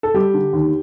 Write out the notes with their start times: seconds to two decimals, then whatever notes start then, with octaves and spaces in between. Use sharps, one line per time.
0.03 A4
0.14 G3 G4
0.34 D3
0.53 D#2